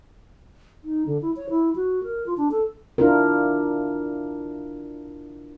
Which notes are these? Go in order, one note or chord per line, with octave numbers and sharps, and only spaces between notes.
D#4
D3
E4
C#5
E4
F#4
A#4
F4
D4
A4
D4 E4 F4 A#4